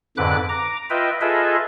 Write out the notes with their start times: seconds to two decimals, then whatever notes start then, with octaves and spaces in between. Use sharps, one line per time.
0.17 F2 G#2 D3 B4 D6 F#6
0.49 A#5 D6
0.90 F4 B4 D#5 E5 G5
1.21 F4 G#4 A4 B4 D#5 E5